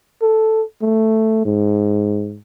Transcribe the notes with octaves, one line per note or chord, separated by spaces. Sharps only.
A4
A3
G#2